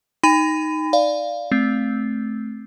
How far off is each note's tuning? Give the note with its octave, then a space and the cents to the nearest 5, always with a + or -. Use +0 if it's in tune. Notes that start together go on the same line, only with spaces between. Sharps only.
D#4 +0 G#5 -45 B5 +30
D5 +0 F5 +0
A3 -15 C4 +0